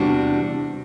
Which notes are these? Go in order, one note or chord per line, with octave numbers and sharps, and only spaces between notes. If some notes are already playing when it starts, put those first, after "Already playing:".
Already playing: E2 C3 G3 D4 F#4